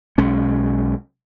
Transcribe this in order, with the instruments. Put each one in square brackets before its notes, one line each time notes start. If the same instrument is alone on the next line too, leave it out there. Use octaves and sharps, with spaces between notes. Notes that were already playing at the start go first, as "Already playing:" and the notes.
[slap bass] B1 G#3 C#4